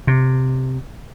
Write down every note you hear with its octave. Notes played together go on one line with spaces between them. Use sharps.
C3